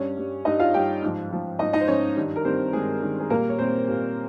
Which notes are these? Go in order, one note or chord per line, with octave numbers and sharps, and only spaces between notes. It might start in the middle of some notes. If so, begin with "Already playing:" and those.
Already playing: G2 G3 C#4 C#5
G2 G3
G2 G3 D#4 D#5
F4 F5
G2 G3 G4 G5
G#2 F3
G#2 F3
G#2 F3 D#4 D#5
D#4 D#5
C5
G#2 F3 C#4 C#5
G2 D#3 G3
A#4
G2 D#3 G3 C4 C5
G2 D#3 G3 G#3 G#4
G2 D#3 G3
G#4
A#2 G3 A#3 A#4
C#5
A#2 G3 C4 C5
A#2 G3